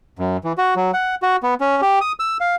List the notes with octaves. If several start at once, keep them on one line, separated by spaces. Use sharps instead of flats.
F#2
E3
F#4
F#3
F#5
F#4
B3
C#4
G4
D#6
E6
F5